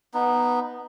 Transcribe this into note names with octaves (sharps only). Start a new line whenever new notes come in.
B3 D#4